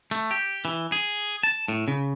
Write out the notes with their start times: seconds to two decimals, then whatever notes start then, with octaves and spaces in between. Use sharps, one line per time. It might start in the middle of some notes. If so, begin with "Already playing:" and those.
0.11 A3
0.31 G4
0.65 E3
0.92 G#4
1.43 A5
1.68 A2
1.88 C#3